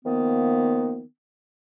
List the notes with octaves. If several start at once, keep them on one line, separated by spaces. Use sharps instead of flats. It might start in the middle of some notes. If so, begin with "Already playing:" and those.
D#3 F3 A#3 B3